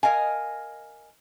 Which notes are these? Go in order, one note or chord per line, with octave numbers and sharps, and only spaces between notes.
A#4 D#5 F5 G#5